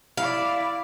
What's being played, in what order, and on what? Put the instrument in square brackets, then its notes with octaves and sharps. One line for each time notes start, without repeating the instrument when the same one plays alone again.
[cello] E4 D5 [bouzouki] F5